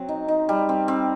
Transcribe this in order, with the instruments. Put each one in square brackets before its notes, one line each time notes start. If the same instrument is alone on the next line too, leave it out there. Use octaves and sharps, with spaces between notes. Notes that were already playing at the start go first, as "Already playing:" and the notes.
Already playing: [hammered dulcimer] F#3 C4
D#4
D#4
G3
C4
C4